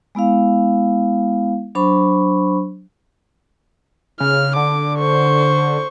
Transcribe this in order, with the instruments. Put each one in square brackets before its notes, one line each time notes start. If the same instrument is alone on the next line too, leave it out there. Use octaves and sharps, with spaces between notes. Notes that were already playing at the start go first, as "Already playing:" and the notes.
[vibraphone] G#3 B3 E4 F5
F#3 D4 C5 B5 C#6
[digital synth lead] C#3 [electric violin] F6
[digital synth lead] D3 [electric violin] D6
[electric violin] C5 C#6